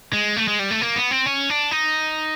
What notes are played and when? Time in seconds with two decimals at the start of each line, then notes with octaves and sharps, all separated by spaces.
0.13 G#3
0.36 A3
0.48 G#3
0.59 G3
0.71 A3
0.81 A#3
0.96 B3
1.11 C4
1.26 C#4
1.50 D4
1.71 D#4